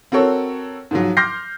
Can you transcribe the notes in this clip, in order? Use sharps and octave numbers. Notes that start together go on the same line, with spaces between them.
C4 F#4 A4 A#4 C#5
G#2 F3 F#3
C6 D6 F6 G6 A#6 C7